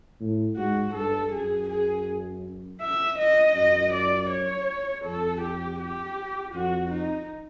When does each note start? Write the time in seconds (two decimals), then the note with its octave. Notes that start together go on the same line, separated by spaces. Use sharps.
0.21 A2
0.57 G#2 F#4
0.94 G2 A4
1.31 F#2 G#4
1.69 G#4
2.81 E5
3.18 D#5
3.55 F#2 D#5
3.93 D5
4.30 C#5
5.04 F2 A4
5.41 G4
5.79 G4
6.54 F2 F#4
6.91 D#4